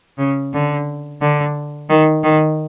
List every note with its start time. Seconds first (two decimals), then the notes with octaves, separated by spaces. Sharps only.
0.18 C#3
0.53 D3
1.20 D3
1.89 D#3
2.23 D#3